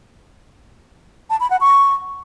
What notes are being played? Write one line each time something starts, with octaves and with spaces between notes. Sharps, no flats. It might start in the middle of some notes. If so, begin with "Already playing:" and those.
A5
B5
F#5
C#6